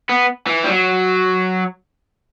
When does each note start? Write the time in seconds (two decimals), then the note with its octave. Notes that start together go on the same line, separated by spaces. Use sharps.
0.09 B3
0.47 E3
0.64 G3
0.69 F#3